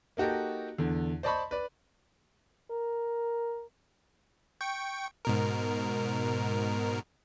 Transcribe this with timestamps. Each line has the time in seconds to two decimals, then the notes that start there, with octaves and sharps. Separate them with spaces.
0.17 A#3 D#4 F#4 G4 A4
0.78 E2 D3
1.23 C5 D5 D#5 A5 B5 C#6
1.51 B4 D5
2.71 A#4
4.61 G5 C#6
5.25 G#2 B2 A#4